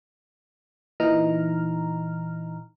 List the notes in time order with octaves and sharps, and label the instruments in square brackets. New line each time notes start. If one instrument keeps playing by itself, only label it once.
[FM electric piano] A#2 E3 D#4 A#5 F6